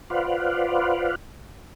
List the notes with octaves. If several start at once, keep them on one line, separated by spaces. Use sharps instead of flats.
F4 B4 C5 D5 F5 F#5